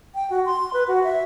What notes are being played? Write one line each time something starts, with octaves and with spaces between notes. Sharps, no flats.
G5
F#4
C6
B4
F#4
E5